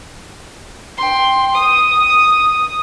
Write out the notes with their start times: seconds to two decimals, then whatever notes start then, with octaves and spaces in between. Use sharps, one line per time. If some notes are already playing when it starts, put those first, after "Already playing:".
0.98 G5 C6
1.55 D#6